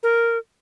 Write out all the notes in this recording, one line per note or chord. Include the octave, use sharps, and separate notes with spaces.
A#4